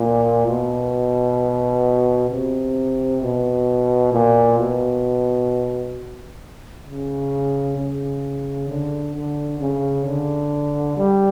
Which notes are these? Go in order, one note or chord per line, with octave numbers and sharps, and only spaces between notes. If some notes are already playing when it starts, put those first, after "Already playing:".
Already playing: A#2
B2
C3
B2
A#2
B2
C#3
C#3
D3
D3
C#3
D3
G3